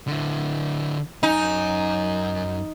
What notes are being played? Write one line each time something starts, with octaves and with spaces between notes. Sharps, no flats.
D3 E4
F#2 D#4 G#5